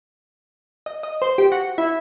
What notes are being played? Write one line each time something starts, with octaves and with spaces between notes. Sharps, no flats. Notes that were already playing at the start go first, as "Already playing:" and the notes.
D#5
D#5
C5
G4
F#4
E4